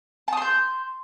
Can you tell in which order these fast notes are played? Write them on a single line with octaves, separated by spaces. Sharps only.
A5 D#6 C6 G6